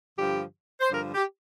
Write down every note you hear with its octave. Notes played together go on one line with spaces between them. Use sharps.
G2 D3 F3 G4
C5
G2 D3 F3 A#4
G4